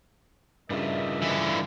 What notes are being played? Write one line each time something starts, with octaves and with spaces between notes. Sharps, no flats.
G2 C#3 G3 E4 F4 A#4 D#5 E5
D3 E3